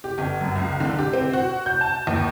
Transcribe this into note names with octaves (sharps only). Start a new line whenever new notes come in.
G4
G1
F#2
C#2
D3
G4
C4
F#4
G6
A5
D#2